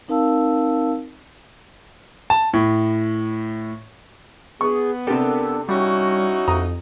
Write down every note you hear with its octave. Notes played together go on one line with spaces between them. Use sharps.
C4 D#4 A#4 F5 A5 E6
A5
A2
B3 G#4 C#6
C3 D4 G4 A4 A#4 E6
G3 C#4 D#4 E4 F#4
F2 A#5 D#6